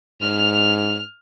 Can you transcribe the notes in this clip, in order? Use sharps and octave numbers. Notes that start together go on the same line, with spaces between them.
G#2 F6 F7